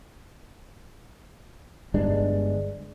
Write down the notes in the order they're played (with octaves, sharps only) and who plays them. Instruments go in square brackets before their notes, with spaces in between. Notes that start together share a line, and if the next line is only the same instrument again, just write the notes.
[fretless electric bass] G1 G2 G#3 D4